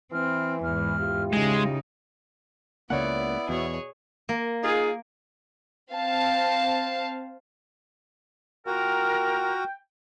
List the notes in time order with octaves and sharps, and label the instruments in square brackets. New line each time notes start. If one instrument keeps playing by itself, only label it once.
[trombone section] E3 [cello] C4 [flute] F6
[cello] E2 G#2 [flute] F6
[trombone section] E4 F4 G4
[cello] C#3 D#4 [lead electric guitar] G#3 [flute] D#5
[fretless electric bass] C#2 C#3 A#3 [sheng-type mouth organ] B3 E4 [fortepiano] C#5 F#5 [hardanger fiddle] D5
[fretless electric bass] E2 [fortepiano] B2 [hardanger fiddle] G#4 C#5
[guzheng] A#3
[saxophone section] D#4 F4 G#4
[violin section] C4 F5 A5
[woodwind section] A#3 F4 A#4 [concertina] F#4 [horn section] G5